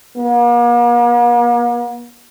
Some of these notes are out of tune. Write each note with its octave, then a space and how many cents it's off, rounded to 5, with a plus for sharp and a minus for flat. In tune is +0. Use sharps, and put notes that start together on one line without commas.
A#3 +45